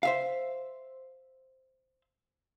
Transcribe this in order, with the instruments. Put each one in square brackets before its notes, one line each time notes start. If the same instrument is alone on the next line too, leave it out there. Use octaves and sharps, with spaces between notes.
[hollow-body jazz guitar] C5 E5 F5